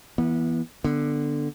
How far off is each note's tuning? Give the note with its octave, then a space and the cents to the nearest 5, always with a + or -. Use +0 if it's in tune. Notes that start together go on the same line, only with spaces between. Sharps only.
E3 +5 B3 -25
D3 +10 B3 +0